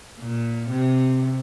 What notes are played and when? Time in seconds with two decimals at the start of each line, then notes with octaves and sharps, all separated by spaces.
0.20 A#2
0.70 C3